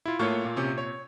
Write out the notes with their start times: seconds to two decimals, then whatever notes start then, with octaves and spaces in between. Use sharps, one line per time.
0.06 E4 F4
0.19 A2 A3 A#3 F4 C#5 C#6
0.45 A#2
0.56 C3 C#4
0.78 C#5